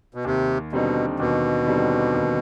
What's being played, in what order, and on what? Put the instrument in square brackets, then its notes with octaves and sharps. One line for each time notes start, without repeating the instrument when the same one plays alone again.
[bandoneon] B2
[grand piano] D#2 [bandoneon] C3
[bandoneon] B2 [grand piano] D3 G3 C4 D#4
[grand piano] D#2 [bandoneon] B2
[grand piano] D3 G3 C4 D#4
D#2